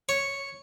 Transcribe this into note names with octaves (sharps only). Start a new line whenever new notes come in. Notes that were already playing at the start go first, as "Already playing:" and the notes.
C#5